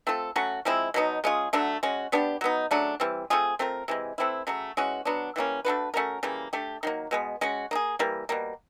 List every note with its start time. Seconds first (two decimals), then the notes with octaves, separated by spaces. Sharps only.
0.07 A3 C4 F4 A4
0.36 F#3 A3 C#4 F#4
0.65 F3 G#3 C4 E4
0.94 B2 F#3 B3 D#4
1.24 G#3 C#4 F4 G#4
1.53 D3 F#3 A3 D4
1.83 G#3 C#4 F#4
2.12 G3 B3 D4 G4
2.41 F#3 B3 D#4
2.71 C#3 F#3 A3 D4
3.00 E3 G3 C4
3.30 A3 C4 F4 G#4
3.59 A3 C4 F4 A#4
3.88 C3 E3 G#3
4.18 E3 A3 C4 E4
4.47 C#3 F#3 A3
4.77 E3 G#3 C#4 F#4
5.05 F#3 B3 D4
5.36 E3 G3 A#3 C#4
5.65 A3 D4 F#4 B4
5.94 A3 C#4 F#4 A#4
6.23 C#3 E3 G3 A#3
6.53 A3 D4 G4
6.83 D#3 F#3 A#3
7.11 B2 G#3 B3
7.41 G#3 C#4 F#4
7.71 A#3 D#4
7.75 G#4
7.99 E3 G3 A#3
8.29 B2 G3 A#3